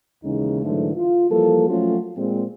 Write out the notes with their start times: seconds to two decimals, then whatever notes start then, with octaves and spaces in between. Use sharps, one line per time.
0.24 D#2 C#3 E3 G#3 C#4 D#4
0.63 G#2 D3 E3 F#3 A3
0.96 F4
1.30 E3 F3 G3 A#3 A4
1.68 F3 F#3 A3 C#4 F4 F#4
2.16 A#2 G#3 C4